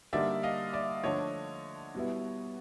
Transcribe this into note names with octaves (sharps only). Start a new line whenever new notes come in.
D3 G3 A#3 D#4 D5 E5
D#5 F5
D5 E5
D3 F3 A3 D4 C#5 D#5
B2 G3 B3 E4